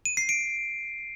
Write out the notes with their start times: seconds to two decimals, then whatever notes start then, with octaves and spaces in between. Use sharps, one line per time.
0.05 D#7
0.17 C7
0.29 D7